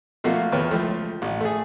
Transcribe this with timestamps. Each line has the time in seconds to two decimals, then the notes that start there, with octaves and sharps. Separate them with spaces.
0.24 B2 F3 A3 A#3 F#4 F5
0.52 E2 B4 C#5 G5 F6
0.71 C#2 F3 A3
1.22 A1
1.41 A3 G#4